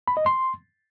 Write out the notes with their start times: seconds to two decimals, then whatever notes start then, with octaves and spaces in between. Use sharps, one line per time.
0.08 B5
0.17 D#5
0.26 C6